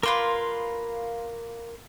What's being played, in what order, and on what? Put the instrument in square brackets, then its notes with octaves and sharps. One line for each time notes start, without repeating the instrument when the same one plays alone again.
[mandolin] A#3 F4 B4 [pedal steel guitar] A#4 C6